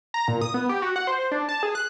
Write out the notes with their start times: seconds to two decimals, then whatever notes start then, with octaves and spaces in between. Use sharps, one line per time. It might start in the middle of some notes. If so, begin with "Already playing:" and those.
0.14 A#5
0.28 A#2
0.42 D#6
0.54 B3
0.69 G4
0.82 F#4
0.96 F#5
1.07 C5
1.31 D4
1.49 A5
1.63 G#4
1.75 F#6